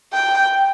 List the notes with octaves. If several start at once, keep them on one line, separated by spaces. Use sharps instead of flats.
G5